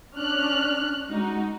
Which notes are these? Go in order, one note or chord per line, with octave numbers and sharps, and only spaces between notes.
C#4 D4 F6 F#6
G#3 D#4 F#4